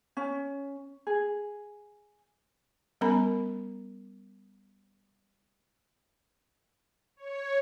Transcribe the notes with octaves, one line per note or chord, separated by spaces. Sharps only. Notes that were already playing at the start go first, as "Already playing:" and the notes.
C#4
G#4
G3 B3 C#4 A#4 A#5 B5
C#5